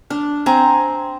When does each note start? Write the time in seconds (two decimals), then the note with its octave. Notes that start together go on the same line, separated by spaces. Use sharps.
0.10 D4 F6
0.46 C4 G#5 A#5